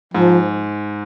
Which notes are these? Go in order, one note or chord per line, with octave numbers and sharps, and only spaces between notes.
G#2 F3